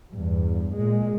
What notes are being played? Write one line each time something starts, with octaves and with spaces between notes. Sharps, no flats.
E2 G2
A#2 G#3